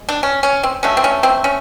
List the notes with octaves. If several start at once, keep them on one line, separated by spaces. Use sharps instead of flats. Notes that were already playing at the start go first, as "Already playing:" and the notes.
Already playing: G#3
D4
C#4
C#4
C4
D3 F#3 A3 C#4
C4
C#4
C4
C#4